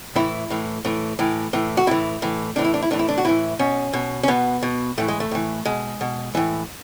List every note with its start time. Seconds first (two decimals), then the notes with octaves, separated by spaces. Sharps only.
0.16 A2 E3 E4
0.50 A2 E3
0.85 A2 E3
1.19 A2 E3
1.53 A2 E3
1.77 F#4
1.87 A2 E3 E4
2.22 A2 E3
2.56 A2 E3 D4
2.64 E4
2.74 D4
2.82 E4
2.91 A2 E3 D4
2.99 E4
3.09 D4
3.18 F#4
3.25 A2 E3 E4
3.59 B2 C#4
3.93 B2
4.23 C#4
4.28 B2 B3
4.63 B2
4.98 A2 E3 A3
5.08 G#3
5.20 A3
5.31 A2 E3
5.65 B2 G#3
6.01 B2
6.35 A2 E3